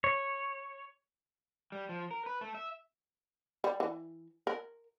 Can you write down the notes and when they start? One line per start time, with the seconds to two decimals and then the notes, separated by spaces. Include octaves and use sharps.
0.04 C#5
1.72 G3
1.89 F3
2.11 A#4
2.26 B4
2.41 A3
2.55 E5
3.64 G3
3.80 E3
4.47 A#4